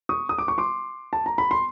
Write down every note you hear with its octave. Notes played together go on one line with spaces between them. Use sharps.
C#6 D#6
D#6
D6
C#6
C6 D6
A5
A#5
B5
C6